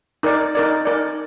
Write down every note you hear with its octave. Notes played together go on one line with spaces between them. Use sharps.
D#4 A#4 D5
D#4 A#4 D5
D#4 A#4 D5